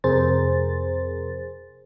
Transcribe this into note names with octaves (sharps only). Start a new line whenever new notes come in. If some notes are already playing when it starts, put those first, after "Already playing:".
F2 C3 G#4 A#4 C5 A6